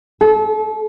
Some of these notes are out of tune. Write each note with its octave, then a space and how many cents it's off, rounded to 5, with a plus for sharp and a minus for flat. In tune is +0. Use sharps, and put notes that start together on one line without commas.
A4 -35